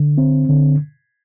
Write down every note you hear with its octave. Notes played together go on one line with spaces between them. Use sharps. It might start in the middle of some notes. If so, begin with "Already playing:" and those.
Already playing: D3
C4
D3